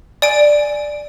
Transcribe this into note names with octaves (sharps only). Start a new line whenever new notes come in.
D5 G#5 D7